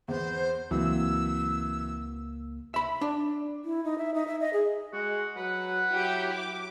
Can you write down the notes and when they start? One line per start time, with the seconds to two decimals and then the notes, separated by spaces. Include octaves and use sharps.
0.08 E2 B3 C5
0.71 C#2 E3 F#3 A#3 C4 E6
2.74 E5 B5
3.01 D4
3.65 E4
3.84 D#4
3.98 E5
4.14 D#4
4.28 E5
4.40 D#5
4.53 G#4
4.93 G#3 F#4
5.36 F#3 B4 F#5
5.91 F#3 E4 G4 G5
6.34 F#3 D6